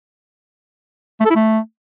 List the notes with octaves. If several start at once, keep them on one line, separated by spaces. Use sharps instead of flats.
A3
A4
E4
A3